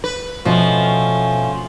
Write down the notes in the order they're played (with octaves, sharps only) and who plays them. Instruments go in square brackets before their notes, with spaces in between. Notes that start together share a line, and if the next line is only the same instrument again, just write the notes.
[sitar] B4
[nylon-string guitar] B2 [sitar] F3 [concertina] A3 C#4 F4